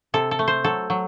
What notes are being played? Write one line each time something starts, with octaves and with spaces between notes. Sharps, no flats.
C3 A4
A4
A3
C5
F#3 A4
F#3